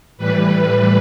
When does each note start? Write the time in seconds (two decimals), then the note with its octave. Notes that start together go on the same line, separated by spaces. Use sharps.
0.18 A2 E3 G3 B4